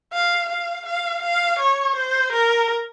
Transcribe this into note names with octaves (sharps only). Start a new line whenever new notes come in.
F5
F5
F5
F5
C#5
C5
A#4